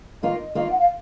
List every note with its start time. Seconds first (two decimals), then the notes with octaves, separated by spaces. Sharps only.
0.23 D#3 A#3 F4 D#5
0.55 D#3 A#3 F4 D#5
0.64 F5
0.71 F#5
0.79 F5